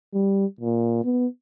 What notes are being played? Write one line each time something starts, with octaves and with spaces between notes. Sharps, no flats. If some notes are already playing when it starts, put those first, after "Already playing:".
G3
A#2
B3